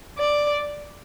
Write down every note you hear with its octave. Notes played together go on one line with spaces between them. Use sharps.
D5